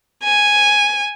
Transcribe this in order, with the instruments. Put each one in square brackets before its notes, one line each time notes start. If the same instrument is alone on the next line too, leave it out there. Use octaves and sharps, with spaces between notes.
[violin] G#5